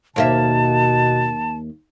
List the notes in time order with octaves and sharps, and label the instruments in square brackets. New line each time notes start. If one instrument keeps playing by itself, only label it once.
[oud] D#2 A#3 E5 [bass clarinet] B2 [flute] A5